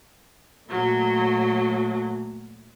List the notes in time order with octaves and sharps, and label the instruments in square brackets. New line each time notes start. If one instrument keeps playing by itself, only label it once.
[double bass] A#2 A3 [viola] F#3